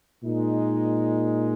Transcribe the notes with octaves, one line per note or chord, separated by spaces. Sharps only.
A#2 G#3 D#4